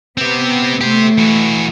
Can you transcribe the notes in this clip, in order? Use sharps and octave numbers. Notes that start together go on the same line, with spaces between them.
B3 C4 G4
A3 G4 C5
E3 F#4